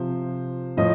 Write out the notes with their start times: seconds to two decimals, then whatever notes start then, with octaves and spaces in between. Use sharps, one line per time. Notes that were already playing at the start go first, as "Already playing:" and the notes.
Already playing: C3 F3 C5
0.77 A2 F3 D#5